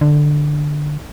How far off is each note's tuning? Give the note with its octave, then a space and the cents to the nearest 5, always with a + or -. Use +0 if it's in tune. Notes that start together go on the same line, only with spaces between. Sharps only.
D3 +10